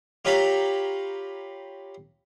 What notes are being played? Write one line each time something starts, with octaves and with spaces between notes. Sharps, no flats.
F4 G4 C#5 F5 A#5 B5